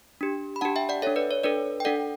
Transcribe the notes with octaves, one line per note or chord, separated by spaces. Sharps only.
D4 G4
B5
D4 G4 F#5 A5
E5 G5
D5 F#5
D4 A4 C#5 E5
B4 D5
C#5
D4 A4 B4 D5
G5
D4 A4 D5 F#5